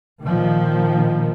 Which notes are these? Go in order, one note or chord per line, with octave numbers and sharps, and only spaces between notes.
A#2 D#3 F3